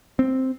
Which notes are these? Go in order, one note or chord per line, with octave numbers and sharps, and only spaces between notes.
C4